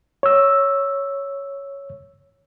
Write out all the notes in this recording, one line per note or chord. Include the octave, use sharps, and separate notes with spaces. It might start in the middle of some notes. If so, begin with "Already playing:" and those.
C#5 E6